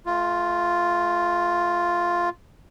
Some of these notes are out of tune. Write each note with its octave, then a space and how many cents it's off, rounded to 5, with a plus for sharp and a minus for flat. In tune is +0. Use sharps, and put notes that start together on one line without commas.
A3 -35 F4 +0